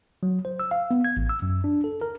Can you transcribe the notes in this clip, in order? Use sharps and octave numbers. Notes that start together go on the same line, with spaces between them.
F#3
C5
E6
F5
B3
G#6
A1
E6
F#2
D4
A4
A#4